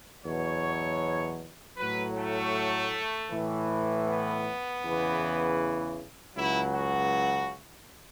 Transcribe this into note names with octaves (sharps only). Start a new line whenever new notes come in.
E2 B2 F#3 C#5
A2 F#3 B4
A3
A2 E3
B3
E2 C#3 E3
C#2 C#3 F#3 E4
F#4